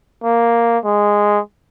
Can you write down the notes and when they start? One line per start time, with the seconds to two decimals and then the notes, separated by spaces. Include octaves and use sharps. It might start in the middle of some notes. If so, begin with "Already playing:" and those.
0.24 A#3
0.85 G#3